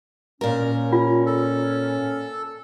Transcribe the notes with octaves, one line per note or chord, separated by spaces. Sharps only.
A#2 C#4 A#4
F4
A4